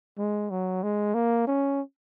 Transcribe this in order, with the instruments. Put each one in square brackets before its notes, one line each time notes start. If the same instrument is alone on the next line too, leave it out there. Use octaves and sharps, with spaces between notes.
[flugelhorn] G#3
F#3
G#3
A#3
C#4